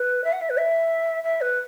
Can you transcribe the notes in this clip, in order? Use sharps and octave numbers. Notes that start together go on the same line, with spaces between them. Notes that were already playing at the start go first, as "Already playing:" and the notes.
Already playing: B4
E5
F#5
E5
B4
E5
E5
B4